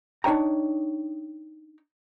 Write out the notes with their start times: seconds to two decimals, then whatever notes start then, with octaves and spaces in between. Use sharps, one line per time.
0.24 D4 D#4 C#5 G5 A#5